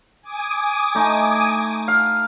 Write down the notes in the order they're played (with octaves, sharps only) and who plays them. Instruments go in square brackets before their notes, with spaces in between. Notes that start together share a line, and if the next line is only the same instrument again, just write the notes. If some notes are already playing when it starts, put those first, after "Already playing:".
[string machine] G#5 D6 D#6
[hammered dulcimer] A3 D#4
F5